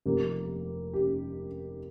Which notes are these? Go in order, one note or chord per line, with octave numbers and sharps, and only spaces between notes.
F1 F2 F3 A#3 G4
G4